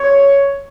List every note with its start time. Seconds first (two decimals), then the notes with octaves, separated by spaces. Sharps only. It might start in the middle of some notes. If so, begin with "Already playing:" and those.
Already playing: C4 G4 C#5